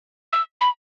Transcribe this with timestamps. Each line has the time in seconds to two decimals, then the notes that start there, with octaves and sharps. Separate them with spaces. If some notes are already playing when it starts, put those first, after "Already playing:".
0.33 E6
0.61 B5